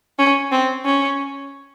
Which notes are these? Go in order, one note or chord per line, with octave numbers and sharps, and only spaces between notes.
C#4
C4
C#4